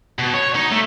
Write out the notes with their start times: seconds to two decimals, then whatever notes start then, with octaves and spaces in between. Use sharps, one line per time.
0.19 B2
0.34 C#5
0.56 D#4
0.72 A3